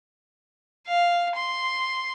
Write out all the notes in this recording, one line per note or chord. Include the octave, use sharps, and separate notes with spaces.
F5
C6